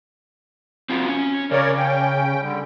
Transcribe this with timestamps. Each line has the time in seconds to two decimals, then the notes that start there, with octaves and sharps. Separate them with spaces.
0.90 C4 F4 F#4
1.09 C#4
1.51 C#3 A#4 C#5 D5
1.77 C#4 G5
2.42 D3 G3